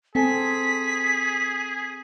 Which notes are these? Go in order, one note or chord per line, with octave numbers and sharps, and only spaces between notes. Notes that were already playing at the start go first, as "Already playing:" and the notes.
C4 G#4 A4 G#5 B6